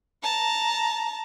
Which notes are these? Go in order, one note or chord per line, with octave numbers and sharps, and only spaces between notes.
A5 A#5